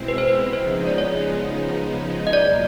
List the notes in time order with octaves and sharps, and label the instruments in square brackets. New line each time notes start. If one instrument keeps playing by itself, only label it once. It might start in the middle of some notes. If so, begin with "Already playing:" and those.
Already playing: [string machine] B2 G#3 C4 E4
[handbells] B4
C5
B4
[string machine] C#3 F3 G#3 B3 D#4 [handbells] C5
[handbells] D5
C#5
D#5
[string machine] E2 B2 F#3 A#3 [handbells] D5